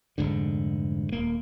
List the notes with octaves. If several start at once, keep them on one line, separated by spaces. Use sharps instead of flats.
F1 A#1 G#2 D3
D#1 A#3